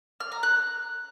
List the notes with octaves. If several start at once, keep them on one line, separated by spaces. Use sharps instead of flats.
F6
A#5
F#6